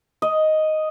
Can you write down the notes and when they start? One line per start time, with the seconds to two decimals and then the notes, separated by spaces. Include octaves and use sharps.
0.22 D#5